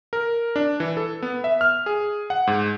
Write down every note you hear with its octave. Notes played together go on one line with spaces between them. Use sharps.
A#4
D4
E3
A4
B3
E5
F6
G#4
F#5
G#2